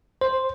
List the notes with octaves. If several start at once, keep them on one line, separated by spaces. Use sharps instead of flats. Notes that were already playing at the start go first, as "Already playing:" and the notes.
C5